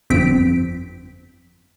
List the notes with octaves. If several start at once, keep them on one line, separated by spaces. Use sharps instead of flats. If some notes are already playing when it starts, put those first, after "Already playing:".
G1 F2 C4 B6 D7